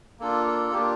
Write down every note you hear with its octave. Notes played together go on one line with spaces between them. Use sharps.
A#3 D4 F4 A4
A4
A#3 D4 F4 G4